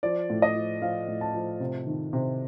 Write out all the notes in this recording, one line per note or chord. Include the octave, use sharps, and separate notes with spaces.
F3 D5
A2
D#5
F3
F3 F5
A2
A5
F3
C3
D#3
C3